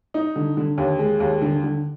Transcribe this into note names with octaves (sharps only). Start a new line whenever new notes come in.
D#4
D3
D3
D#2
G#3
D#2
D3
D3